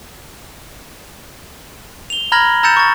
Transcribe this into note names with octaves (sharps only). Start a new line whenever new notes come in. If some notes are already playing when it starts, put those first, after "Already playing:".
F7 G7
A#5 B5 F6 G#6 A#6 F#7
A#5 E6 G6 A6 C#7 E7
C#6 A6